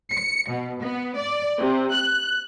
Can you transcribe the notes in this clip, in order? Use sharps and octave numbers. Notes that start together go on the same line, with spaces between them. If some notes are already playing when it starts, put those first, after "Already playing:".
C#7
B2
B3
D5
C3
F#6